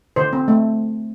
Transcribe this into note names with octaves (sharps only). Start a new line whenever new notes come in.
D3 C5
C4
A3